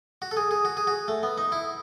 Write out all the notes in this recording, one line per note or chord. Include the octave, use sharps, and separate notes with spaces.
F#4
A4
G#4
G#4
F#4
G#4
F#4
A3
B3
D#4
E4